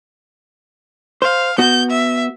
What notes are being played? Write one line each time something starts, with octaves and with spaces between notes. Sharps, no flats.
C5 F5
B3 F#4 G6
E5